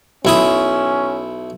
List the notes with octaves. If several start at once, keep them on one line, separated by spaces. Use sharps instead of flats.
B1 C#4 E4 D#6